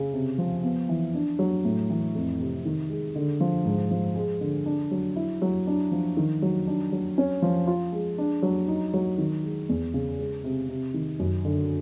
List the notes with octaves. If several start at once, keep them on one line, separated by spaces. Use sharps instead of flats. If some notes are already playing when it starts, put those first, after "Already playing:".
Already playing: C#3
C3
F3
B3
E3
D4
F#3
A2
E3
F2
C3
D#3
G#3
D3
F3
G#2
F3
G#3
D3
D4
F#3
E4
F#3
D4
F3
D#3
F#3
D4
F#3
C#4
F3
F4
G#3
D4
F#3
D#4
F#3
D#3
G#3
E2
C#3
G#3
C3
C3
D#3
F#2
D3